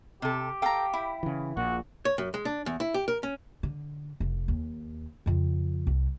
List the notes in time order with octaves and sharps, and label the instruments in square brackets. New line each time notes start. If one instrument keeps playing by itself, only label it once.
[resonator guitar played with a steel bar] C3 A4 [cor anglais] G4
[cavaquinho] A4 A#5 [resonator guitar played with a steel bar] F5 G5
[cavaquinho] E4 B5
[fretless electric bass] C#3 E3
[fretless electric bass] A#1 A#2 [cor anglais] F#4
[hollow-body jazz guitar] C#5
F#2
G#3
D4
E2
E4
G4
A#4
C#4
[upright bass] D3
F1
D#2
F2 C#3
C2